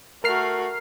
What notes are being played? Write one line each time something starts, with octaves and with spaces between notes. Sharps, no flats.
A3 F#4 A#4 F6 C7